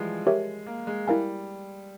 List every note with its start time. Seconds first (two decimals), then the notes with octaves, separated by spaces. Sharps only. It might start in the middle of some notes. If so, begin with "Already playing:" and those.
Already playing: E3 F3 G3 G#3
0.27 G4 A#4 C#5 E5
0.66 A#3
0.87 G#3
1.07 G3 E4 A#4 F5 G#5